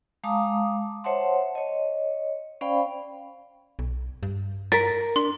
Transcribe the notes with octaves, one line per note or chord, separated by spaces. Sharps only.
G#3 F5 A5 A#5 D6 D#6
C5 C#5 E5 F#5 A5 C6
C#5 D#5
C#4 C5 D5 F5 G5 B5
B1
G2
A#4 A6 B6
D4 C6